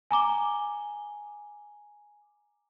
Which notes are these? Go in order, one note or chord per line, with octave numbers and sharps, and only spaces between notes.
G#5 A#5 D6 G7